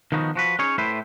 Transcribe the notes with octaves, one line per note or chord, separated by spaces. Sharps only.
D#3 F3 B3 D#4 F#4
F3 F#4 B4
C#4 D#4 G#4 C#5
A2 A3 E4 B4 C5